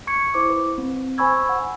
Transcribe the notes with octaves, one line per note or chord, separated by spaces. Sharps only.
C#6 G#6 C#7
E4 C5 D6
B4
C4
C5 G#5 B5 C#6 E6 G#6
F#5